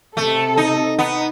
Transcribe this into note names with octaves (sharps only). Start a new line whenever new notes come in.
C3 A3 A4
D#4
B3 D#4